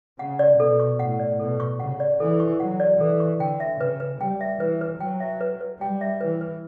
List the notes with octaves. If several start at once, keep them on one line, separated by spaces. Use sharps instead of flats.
C#3 F#5
D5
B2 A4
C#6
A2 F#5
D5
B2 A4
C#6
C#3 F#5
D5
E3 A4
C#6
F#3 F#5
D5
E3 A4
C#6
D3 G5
E5
C#3 B4
B4
G3 G5
E5
E3 B4
B4
F#3 G5
E5
B4
B4
G3 G5
E5
E3 B4
B4